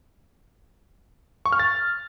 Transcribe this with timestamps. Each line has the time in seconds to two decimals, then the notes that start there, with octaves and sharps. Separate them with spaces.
1.46 C#6
1.52 F6
1.59 A6